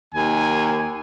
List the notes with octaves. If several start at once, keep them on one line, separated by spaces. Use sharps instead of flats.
D#2 G#5